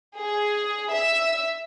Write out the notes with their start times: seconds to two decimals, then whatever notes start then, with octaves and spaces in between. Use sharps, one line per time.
0.16 G#4
0.92 E5 E6